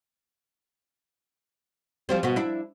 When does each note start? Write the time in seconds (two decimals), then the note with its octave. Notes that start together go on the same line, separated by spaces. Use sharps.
2.09 F3 G3 C4
2.23 B2 B3
2.36 D4 E4